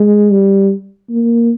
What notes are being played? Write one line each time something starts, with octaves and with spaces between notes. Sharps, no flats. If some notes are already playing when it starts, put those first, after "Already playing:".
Already playing: G#3
G3
A#3